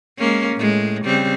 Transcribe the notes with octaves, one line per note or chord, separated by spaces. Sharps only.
G#3 A#3 C#4
A2 G#3
C#3 G3 C4